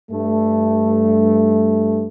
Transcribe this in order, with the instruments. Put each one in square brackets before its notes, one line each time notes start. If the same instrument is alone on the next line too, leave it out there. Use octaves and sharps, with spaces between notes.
[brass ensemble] G2 A3